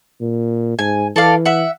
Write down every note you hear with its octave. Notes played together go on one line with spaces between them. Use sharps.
A#2
G#2 G#5
E3 A4 D5 F5
E5 F#5